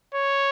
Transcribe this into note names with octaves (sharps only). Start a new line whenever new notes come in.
C#5